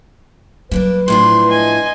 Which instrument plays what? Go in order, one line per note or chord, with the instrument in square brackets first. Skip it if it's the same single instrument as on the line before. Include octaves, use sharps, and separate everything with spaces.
[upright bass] F#3 G3 [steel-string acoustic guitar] A#3 B3 D4 [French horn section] B4
[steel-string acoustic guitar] A2 F3 D4 [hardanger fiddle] C6
[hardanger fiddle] D#5 G#5